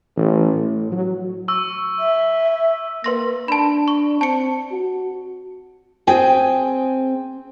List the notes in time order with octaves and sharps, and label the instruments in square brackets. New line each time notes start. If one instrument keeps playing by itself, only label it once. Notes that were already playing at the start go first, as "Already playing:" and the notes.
[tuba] A1
A2
F#3
[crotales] C#6 E6
[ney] E5
[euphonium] A#3 [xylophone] B4 C6 A#6
[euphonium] D4 [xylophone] A5 B5
[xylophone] C#6
[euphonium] C4 [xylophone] A5 C#7
[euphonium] F#4
[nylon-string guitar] C4 G#4 G5 G#5